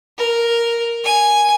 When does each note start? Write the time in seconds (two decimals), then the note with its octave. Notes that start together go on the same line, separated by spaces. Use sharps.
0.18 A#4
1.04 G#5